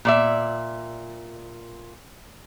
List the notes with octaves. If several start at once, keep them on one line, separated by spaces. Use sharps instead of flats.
A#2 D5 E5